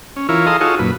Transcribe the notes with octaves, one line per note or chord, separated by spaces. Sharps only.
C#4
E3 E4 F4 A#4 C#5
G#4 A4 D#5 F5 A#5 C6
D#4 F4 F#4 G#4 A4 C#5
F#2 A#2 B4